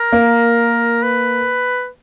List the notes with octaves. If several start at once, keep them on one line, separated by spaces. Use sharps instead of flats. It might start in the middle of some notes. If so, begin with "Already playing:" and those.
Already playing: A#4
A#3
B4